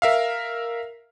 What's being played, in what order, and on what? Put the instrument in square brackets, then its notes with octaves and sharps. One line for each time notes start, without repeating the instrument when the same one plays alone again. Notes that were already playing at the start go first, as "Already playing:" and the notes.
[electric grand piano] A#4 E5 F5